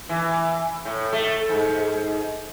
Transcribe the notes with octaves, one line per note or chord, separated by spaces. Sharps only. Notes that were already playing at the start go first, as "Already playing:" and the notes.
E3
A2
A3
G#2